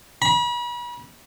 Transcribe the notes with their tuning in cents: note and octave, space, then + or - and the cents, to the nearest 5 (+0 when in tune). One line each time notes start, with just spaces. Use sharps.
B5 -40